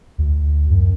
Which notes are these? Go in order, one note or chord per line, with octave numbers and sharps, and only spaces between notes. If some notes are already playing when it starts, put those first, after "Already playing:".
D2
F#2